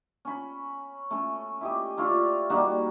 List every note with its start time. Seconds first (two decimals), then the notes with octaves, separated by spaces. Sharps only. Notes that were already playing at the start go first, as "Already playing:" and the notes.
0.25 C#4 B5
1.10 A3 C#4
1.61 E4 G4 D#5
1.97 A3 E4 F4 D5
2.50 G3 A#3 D#4 F#4